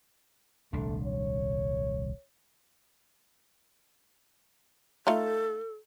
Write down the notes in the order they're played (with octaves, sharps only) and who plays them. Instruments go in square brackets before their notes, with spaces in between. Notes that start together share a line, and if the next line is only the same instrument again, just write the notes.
[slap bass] D#1 C2 D4 [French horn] A3
[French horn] C#5
[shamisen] A3 D#4 F4 [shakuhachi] A4